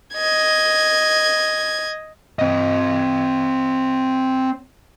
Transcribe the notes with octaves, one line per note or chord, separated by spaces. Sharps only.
D#5 G#6
C4 D#5